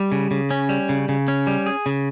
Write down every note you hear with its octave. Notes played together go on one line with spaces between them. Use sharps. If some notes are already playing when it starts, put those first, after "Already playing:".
Already playing: G3
C#3
C#3
C#4
G3
C#3
C#3
C#4
G3
G#4
C#3